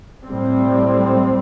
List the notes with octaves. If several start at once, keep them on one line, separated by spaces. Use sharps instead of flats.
A2 G3 C4